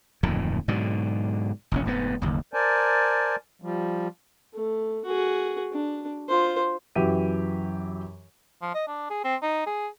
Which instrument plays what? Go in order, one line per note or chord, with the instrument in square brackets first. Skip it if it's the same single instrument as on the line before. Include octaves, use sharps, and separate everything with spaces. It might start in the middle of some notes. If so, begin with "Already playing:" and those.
[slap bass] D1 F2 A#2 D#3
G#2 B2 D3 F#3
F1 A#1 C#4
F1 G#2 D3 B3
F#1 D#2
[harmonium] A#4 C5 D5 G#5 A5
F3 G3
[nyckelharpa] A3
F#4 G#4
D4
F4 C5
[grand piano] F#2 E3 F#3 G4 E5 D#7
[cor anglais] F3
D#5
D4
G#4
C4
D#4
G#4